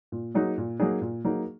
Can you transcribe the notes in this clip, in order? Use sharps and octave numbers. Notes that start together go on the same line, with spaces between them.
A#2
F#3 A#3 D#4 G#4
A#2
F#3 A#3 D#4 G#4
A#2
F#3 A#3 D#4 G#4